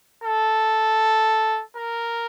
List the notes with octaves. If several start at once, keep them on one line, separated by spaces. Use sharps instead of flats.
A4
A#4